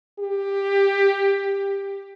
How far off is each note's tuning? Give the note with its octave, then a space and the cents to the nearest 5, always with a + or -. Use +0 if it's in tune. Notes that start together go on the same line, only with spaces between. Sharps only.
G4 +15